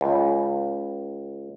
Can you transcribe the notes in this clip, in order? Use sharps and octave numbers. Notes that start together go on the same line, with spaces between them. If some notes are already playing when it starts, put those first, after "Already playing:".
C#2